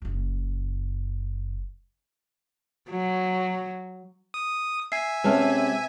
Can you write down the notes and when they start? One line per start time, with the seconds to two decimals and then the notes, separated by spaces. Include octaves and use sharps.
0.02 F#1 F#2
2.89 F#3
4.34 D#6
4.92 E5 G#5 C7
5.24 C3 G#3 C#4 F4 B4 A5 F6